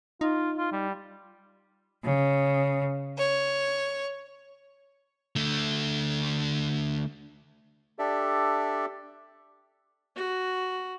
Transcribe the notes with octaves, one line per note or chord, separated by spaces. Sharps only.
D#4 F4
F4
G3
C#3
C#5
D3 A3
D4 G4 A4 D5 E5
F#4